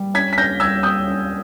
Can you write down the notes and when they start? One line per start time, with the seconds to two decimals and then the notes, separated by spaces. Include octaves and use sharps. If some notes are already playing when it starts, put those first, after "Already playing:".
Already playing: G3
0.14 C#4 G#6 B6
0.33 B6
0.37 C#4 G6 A#6
0.60 G3 E6 G#6
0.83 G3 D#6 G6
1.07 C#4